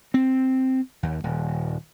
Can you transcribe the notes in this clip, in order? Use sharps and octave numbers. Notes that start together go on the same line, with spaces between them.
C4
D#2
D#1